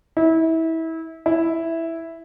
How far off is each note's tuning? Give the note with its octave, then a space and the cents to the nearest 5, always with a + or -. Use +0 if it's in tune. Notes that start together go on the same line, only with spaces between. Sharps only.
E4 -25
E4 +0